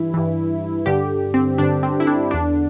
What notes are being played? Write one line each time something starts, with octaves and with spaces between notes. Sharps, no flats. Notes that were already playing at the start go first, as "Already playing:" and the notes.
Already playing: G2 E3 E4
G2 E3
G2 D3 G4
C4
G2 D3 D4
C4
E4
D4
E2 D3 D4